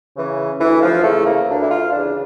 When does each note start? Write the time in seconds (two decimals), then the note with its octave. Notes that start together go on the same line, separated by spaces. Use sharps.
0.15 C#3 E3
0.59 D2 E3
0.81 F3
1.03 C#3 E3 A3
1.26 A#3
1.48 D2 D4
1.62 E4
1.70 F4
1.92 C#3 E3 D4